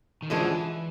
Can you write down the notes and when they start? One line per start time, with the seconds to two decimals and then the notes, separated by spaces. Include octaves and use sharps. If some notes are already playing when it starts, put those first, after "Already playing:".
0.22 D#3
0.30 F#2 D3 E3 F3 G#3